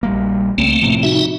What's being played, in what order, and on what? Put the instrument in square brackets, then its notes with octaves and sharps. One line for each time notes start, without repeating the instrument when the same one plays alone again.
[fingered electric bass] A#1 G3 A#3
[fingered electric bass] C#2 [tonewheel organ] A3 A#3 C4
[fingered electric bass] A2 C3 F3
[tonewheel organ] D#4 F#4 E5